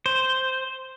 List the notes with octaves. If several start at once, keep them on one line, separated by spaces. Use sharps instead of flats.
C5